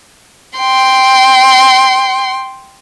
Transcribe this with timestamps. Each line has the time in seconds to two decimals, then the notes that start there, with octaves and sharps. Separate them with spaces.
0.58 G5 C6